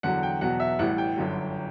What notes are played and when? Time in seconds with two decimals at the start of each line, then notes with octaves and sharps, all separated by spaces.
0.03 E2 D3 F#3 F#5
0.23 G5
0.41 E2 B2 F#3 F#5
0.60 E5
0.79 A1 A2 E3 G3 F#5
0.98 G5
1.17 G1 F#2 D3 F#3